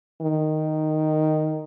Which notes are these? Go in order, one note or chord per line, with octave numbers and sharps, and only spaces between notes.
D#3